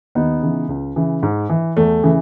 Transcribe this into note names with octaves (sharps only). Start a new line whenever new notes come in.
D#2 B3 D#4
C#3 E3
C#2
C#3 E3
G#2
E3
E2 A3
C#3 E3